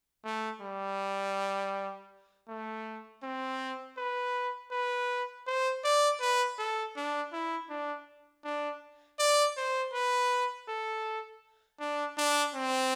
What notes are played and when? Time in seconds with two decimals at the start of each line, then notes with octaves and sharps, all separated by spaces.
0.25 A3
0.61 G3
2.48 A3
3.23 C4
3.97 B4
4.71 B4
5.47 C5
5.84 D5
6.20 B4
6.59 A4
6.96 D4
7.33 E4
7.70 D4
8.44 D4
9.19 D5
9.57 C5
9.94 B4
10.68 A4
11.80 D4
12.18 D4
12.55 C4